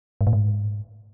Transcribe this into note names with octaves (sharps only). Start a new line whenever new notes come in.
G#2
A2
G#2